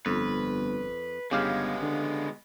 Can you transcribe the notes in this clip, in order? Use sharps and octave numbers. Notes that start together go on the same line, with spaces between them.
G1 F2 B4
G1 C#3 G#3 B3 G4 F5
D3